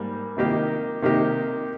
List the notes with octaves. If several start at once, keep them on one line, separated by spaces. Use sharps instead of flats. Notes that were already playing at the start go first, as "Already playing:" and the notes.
Already playing: G#2 G3 A#3
C3 D#3 A#3 D#4 G4
C3 D#3 A#3 D#4 G4